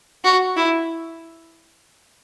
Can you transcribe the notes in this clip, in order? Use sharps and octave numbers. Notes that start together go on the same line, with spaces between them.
F#4
E4